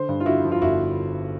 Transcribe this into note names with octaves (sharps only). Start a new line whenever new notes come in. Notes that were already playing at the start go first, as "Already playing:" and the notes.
Already playing: D3 C5
G2
F4
D3 E4 F#4
F3
F4
G1 E4 F#4